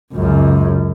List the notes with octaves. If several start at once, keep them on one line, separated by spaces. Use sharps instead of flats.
C#2 F#2